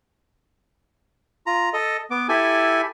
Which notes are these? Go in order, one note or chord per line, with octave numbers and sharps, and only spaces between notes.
F4 A#5
A4 D#5
B3 D6
E4 G4 A4 G#5